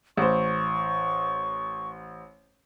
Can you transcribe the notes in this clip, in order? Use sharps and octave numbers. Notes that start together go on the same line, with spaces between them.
A1 C5 C#6